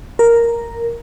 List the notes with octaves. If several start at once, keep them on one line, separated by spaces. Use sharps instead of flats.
A#4